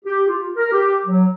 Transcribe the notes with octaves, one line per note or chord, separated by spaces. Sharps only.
G4
F4
A#4
G4
F#3